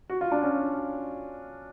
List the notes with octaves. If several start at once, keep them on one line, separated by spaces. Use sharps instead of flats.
F#4
F4
D4
C#4